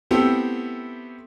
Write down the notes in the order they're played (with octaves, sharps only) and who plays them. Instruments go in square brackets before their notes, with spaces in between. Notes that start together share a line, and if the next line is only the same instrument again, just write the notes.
[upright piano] A3 B3 C4 E4 G4 A4